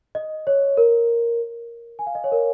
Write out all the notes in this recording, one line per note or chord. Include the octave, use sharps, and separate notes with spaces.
D#5
C#5
A#4
G#5
F5
D#5
C#5
A#4